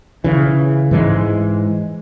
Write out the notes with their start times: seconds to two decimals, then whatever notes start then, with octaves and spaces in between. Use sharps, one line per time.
0.24 C#3 E3
0.91 G#2 E3 G#3